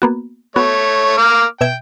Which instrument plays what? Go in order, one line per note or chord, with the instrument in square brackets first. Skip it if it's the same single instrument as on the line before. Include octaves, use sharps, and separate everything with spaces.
[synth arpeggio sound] A#3 B3 F#4
[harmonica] A3 C#5 [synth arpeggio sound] B3 F#4
[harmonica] A#3 D6 F6
[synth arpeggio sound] B2 E5 G#6 [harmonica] G5